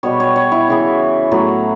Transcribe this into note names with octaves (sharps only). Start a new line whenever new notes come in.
B2 G3 B3 C#5
C#5
C#5
E4
C#3 E3 B3
A2 F#3 B3